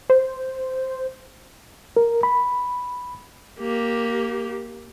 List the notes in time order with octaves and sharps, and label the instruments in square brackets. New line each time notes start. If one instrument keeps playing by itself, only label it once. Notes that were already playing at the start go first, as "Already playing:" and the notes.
[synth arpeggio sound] C5
[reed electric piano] A#4
B5
[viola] A#3 G4